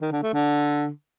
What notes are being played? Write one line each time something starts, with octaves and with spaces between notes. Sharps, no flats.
D#3
D3
A3
D3